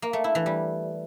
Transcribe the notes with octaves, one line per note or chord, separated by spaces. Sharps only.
A#3
A3
E4
E3
G3